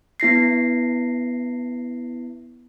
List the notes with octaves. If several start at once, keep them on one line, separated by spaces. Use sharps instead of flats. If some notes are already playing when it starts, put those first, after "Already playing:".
B3 E4 A#6 C7